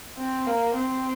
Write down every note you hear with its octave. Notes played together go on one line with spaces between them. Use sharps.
C4
A#3
C4